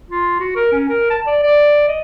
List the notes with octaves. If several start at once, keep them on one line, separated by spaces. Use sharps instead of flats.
F4
F#4
A#4
C#4
A#4
A5
D5
D5
D#5